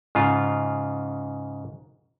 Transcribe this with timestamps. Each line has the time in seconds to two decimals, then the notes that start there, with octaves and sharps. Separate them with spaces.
0.15 G#2 C#3 F4